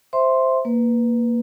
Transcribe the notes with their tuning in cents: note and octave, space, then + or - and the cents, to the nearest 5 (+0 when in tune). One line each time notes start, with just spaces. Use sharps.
C5 +0 E5 +0 C6 +0
A#3 +0 B4 +0